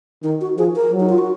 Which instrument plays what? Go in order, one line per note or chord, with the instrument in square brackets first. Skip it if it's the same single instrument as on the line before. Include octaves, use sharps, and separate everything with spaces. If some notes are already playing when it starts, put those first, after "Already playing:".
[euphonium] D#3 [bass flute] D#4
[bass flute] F#4
[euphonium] F3 [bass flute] G#4
[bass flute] A#4
[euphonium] F#3
[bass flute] D#4
F4
F#4